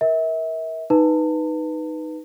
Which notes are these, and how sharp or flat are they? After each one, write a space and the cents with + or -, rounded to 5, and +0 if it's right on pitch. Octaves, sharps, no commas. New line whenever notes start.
A#4 +20 E5 -35
D#4 +0 B4 +0 A5 +35